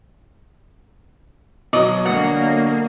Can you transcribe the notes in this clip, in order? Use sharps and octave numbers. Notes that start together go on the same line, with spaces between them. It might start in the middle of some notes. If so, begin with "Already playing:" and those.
B2 F#3 D5 D#5
D3 A#3 F#5